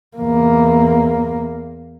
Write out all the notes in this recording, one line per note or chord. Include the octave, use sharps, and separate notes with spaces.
E2 A#3